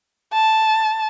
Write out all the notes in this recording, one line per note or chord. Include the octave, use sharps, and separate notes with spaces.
A5